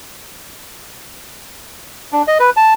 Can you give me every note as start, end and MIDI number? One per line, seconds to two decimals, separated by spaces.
2.13 2.22 62
2.28 2.38 75
2.40 2.50 71
2.57 2.74 81